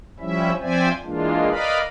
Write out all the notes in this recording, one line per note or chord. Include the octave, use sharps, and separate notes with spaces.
F3 G3 C#4 E4 E5
F3 C4 C5 D5 E5 G#5
E3 G#3 A#3 D4 F4
A#4 B4 D5 D#5 F5 B5